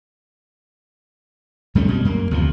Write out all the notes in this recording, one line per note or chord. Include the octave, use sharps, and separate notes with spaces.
F#2 G3 A3 C#4
B2 G3
F#2 A#3
D2 C3 F3